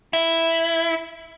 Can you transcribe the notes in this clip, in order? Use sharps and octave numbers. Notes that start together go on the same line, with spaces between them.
E4